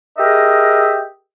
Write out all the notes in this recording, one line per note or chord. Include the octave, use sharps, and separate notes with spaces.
G4 G#4 A#4 D#5 E5